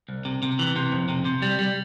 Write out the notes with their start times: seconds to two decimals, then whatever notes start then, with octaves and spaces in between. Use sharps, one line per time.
0.09 C2
0.25 C3
0.43 C3
0.59 E3
0.76 C3
0.92 F2
1.09 C3
1.25 C3
1.42 G3
1.59 G3